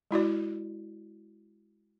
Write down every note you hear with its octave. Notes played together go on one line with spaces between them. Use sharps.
G#3 E4 F#4 D5